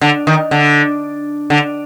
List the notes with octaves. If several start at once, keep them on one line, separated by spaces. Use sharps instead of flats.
D3
D#3
D3
D3